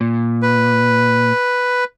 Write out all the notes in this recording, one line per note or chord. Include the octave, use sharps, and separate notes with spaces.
A#2
B4